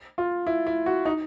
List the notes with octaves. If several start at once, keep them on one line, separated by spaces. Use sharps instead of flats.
F4
E4
E4
F#4
D#4